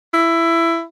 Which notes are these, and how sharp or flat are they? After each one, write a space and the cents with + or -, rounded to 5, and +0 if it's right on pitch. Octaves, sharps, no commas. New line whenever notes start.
E4 +15